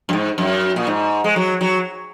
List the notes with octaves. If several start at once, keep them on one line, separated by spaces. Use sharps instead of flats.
F#2
G#2
F#2
A#2
G#2
G#3
F#3
F#3